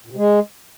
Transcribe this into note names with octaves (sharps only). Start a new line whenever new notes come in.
A#2
C3
G#3